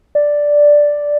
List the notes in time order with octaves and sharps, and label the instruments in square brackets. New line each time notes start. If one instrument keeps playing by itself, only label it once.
[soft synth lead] D5